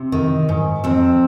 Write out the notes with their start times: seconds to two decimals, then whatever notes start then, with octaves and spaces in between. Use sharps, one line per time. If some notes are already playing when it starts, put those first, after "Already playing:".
Already playing: C3
0.12 D#3
0.49 G#2
0.84 F2 C4